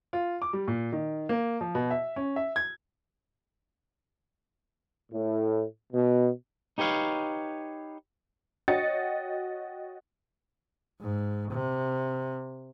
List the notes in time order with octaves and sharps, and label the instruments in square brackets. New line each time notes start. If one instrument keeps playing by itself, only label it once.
[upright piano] F4
D6
G3
A#2
D#3
A#3
F3
B2
E5
C#4
E5
G#6
[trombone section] A2
B2
[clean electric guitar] D#4 G4 B4 C#5 F5
[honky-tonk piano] F#4 C#5 D#5 G5 A6 C#7
[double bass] G#2
C3